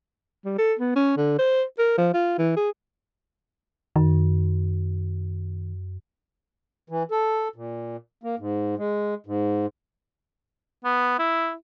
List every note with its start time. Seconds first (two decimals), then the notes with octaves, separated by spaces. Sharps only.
0.45 G3
0.58 A4
0.79 B3
0.96 C#4
1.17 D3
1.39 C5
1.78 A#4
1.98 F3
2.14 F4
2.38 E3
2.56 G#4
3.96 F#2 D#3
6.89 E3
7.11 A4
7.56 A#2
8.23 A#3
8.39 G#2
8.78 G#3
9.26 G#2
10.84 B3
11.19 E4